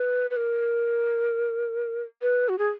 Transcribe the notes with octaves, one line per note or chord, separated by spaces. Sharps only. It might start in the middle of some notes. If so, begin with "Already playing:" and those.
Already playing: B4
B4
A#4
B4
F#4
G#4